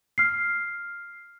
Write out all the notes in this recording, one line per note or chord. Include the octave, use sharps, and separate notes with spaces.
F6 C7